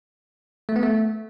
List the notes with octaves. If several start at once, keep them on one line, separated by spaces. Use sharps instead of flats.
A3
B3
A3